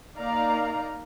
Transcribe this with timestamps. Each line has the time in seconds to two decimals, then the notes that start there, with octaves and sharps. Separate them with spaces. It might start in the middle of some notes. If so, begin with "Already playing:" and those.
0.17 A#3 D#4 D5 F5 A#5